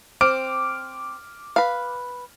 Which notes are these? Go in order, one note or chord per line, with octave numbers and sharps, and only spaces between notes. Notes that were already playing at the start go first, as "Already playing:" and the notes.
C4 D6 F6 D7
B4 F5